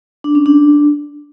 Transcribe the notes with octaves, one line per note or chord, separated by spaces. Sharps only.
D4
C#4
D4